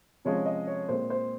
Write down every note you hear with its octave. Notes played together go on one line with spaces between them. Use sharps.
C3 F3 G#3 C#4 C#5
D#5
C#5
A#2 G#3 C4 C5
C5